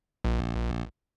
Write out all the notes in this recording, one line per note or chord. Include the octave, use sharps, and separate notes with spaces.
A#1